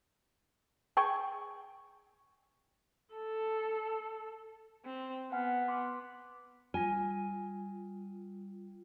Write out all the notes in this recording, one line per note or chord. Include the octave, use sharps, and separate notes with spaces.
G#4 G5 C#6
A4
C4
B3 F#5 G#5 F6
C6 D6
G3 F4 G#5